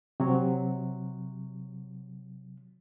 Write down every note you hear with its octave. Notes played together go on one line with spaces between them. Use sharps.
C3 F#3